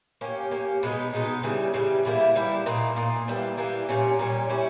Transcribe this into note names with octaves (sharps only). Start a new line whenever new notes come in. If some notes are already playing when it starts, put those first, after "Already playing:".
A#3 C#4 G4
A#3 C#4 G4
B2 G#3 B3 D#4
B2 G#3 B3 D#4
C#3 E3 G3
C#3 E3 G3
E3 G3 A#3 E4
E3 G3 A#3 E4
A#2 A#3 D#4
A#2 A#3 D#4
E3 G3 A#3
E3 G3 A#3
A#2 G3 C#4
A#2 G3 C#4
G3 C#4 E4